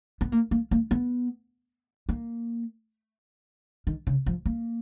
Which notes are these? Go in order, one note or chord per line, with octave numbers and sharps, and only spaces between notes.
B3
A#3
A#3
A#3
B3
A#3
D#3
C#3
F3
A#3